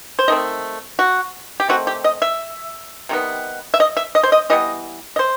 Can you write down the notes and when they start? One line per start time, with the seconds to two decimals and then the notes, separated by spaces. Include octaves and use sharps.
0.19 C5
0.28 D#3 A3 C4 D#5
0.99 F#4
1.60 G4
1.68 D#3 A3 C4 F#4
1.87 G4
2.04 D#5
2.22 E5
3.09 C3 D#3 G3 B3
3.74 E5
3.80 D#5
3.97 E5
4.15 D#5
4.23 C5
4.32 D#5
4.50 E3 G3 B3 D#5
5.16 D#5
5.19 C5